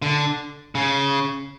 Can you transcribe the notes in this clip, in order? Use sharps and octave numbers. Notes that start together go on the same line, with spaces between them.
D3
C#3